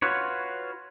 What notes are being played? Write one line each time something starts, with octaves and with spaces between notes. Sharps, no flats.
F4 F#4 B4 C#5